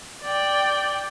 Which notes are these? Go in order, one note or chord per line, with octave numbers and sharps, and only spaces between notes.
D5 G5